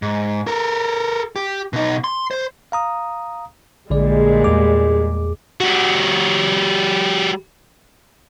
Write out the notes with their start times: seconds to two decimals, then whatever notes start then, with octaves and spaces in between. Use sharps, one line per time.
0.02 G#2
0.47 A4 A#4
1.36 G4
1.73 B2 D#4
2.04 C6
2.31 C5
2.72 F5 A#5 D#6
3.90 A#1 A#2 D3 G3 G#3 D5
4.44 E2 G#4 D6
5.60 G3 F#4